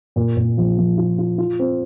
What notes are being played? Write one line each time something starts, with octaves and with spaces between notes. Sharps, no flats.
A#2
A#2
F3
F3
F4
F4
F4
C4